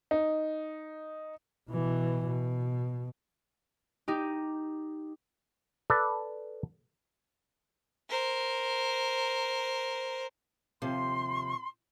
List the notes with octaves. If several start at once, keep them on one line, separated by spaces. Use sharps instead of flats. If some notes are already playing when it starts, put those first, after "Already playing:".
D#4
B2 E3
B2
D#4 G4
A4 B4 D5
A#4 C5
D#2 C3 F3 C6